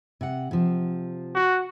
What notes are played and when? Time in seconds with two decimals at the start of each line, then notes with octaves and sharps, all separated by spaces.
0.21 C3 F#5
0.51 C3 F3
1.35 F#4